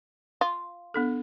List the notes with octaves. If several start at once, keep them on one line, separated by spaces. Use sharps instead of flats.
F4
B3 D4 A4